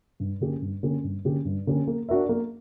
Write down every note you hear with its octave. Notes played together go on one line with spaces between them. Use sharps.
G2
D3 A#3 C#4 G4
G2
D3 A#3 C#4 G4
G2
D3 A#3 C#4 G4
G2
D3 A#3 C#4 G4
A#3
D4 F#4 A#4 E5
A#3